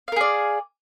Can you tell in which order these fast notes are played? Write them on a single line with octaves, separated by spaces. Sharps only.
F5 A#4 G#4 D5